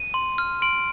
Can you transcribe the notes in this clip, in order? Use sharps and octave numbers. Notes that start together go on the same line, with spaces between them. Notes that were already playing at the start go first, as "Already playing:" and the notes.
Already playing: D#7
C6
F6
C6 D7